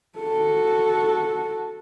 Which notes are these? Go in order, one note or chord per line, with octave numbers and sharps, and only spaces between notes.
F#4 A4